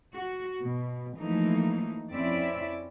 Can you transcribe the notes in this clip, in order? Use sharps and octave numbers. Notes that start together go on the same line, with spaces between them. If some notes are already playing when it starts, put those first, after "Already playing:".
F#4
B2
E3 F3 A3 A#3 D#4
F2 C4 C#4 E4 D5 E5